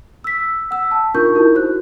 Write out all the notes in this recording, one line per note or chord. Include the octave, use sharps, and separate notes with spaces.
E6 B6
F#5 E6
A5
D4 D#4 F4 A#4 C#6 G6
D#4 E4 F#4 A#4
F#4 C5 F#6